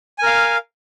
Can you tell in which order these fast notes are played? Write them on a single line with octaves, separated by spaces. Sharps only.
G#5 A#4 F5